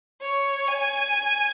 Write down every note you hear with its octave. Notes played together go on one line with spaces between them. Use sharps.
C#5
G#5